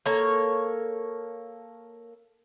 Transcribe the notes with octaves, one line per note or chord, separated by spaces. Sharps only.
A#3 A4 C#5